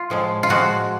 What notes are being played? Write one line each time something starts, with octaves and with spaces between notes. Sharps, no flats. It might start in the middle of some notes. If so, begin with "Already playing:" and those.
Already playing: F4
A2 F3 G#3
F4
A2 F3 G#3 F#4